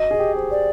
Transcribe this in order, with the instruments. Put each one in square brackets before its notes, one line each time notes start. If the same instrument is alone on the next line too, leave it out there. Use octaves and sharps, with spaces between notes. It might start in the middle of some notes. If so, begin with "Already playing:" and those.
Already playing: [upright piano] F#4 [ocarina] D#5
[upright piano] G#4
G4
C5
[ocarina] D5